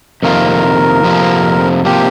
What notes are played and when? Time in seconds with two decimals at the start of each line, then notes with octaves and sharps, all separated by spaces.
0.22 F2 C3 D#3 A#3 F4 A#4
1.03 F2 C3 F3 A#3
1.85 C3 F3 A#3 G4